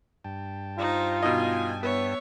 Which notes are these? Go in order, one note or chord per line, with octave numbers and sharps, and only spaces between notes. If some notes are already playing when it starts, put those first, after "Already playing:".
G2 G5 A5
D#4 F4 C5
B2 D#4 D#5 G#5
B3 C#5 E5